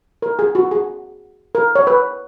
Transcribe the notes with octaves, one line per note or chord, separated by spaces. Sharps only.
A#4
G#4
F#4
G#4
A#4
C#5
B4